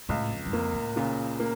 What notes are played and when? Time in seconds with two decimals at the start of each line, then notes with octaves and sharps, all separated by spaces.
0.09 C#2 A2
0.31 F2
0.46 G2
0.53 F2 A#3
0.74 A2
0.96 A#2 C#3
1.39 A#3